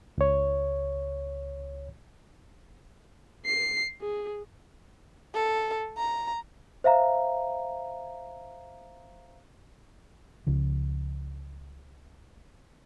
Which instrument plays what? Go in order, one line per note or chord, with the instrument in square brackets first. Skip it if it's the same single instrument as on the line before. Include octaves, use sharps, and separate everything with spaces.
[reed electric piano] C#2 C#5
[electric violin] C7
G#4
[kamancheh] A4
A#5
[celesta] C5 E5 F5 A#5
[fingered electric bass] C#2 C#3 F3